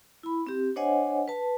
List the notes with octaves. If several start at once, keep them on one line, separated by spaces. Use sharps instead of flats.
E4 B5
C4 G4
D4 C5 C#5 D#5 F#5 G#5
B4 A5